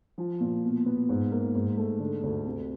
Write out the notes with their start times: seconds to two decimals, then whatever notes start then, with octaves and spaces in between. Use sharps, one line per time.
0.18 F3
0.40 A#2
0.63 B2
0.86 B3
1.09 G#2
1.32 A#3
1.55 G#2
1.77 A3
2.00 D3
2.23 D2
2.46 C3